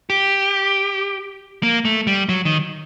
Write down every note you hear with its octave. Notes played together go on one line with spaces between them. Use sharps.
G4
A#3
A3
G3
F#3
D#3